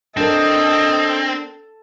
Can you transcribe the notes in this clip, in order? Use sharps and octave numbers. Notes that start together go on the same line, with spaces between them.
C4 D4 A4 A#4 D#5